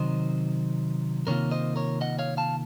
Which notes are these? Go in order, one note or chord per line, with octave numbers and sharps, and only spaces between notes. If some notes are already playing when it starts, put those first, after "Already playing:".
Already playing: C3 D#3 F#3 C5 D#5
C3 D#3 A#3 F4 A#4 C#5
C5 D#5
A#4 C#5
D#5 F#5
C#5 F5
F5 A5